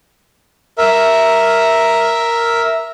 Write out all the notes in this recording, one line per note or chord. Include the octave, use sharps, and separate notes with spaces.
A#4 E5